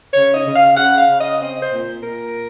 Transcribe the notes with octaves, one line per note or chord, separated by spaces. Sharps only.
C#3 C#5
D#5
C#3
F5
C#3 F#5
F5
C#3
D#5
C4 D#5
C5
A#2
A#2 A#4